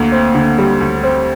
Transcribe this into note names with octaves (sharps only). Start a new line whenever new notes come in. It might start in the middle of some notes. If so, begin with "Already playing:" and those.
Already playing: D2 A#3
C4
D3
G3
D2
C4